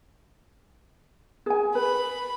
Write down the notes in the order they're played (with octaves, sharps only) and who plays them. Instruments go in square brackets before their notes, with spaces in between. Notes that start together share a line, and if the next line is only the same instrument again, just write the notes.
[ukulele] G#4 G#5
[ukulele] B4 [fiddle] B5